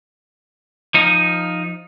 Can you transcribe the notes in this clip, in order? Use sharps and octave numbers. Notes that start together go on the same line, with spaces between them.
F3 D#4